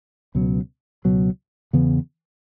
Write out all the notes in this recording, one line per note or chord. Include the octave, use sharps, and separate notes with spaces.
C#2 B2 F#3
C#2 B2 F#3
E2 C#3 E3 B3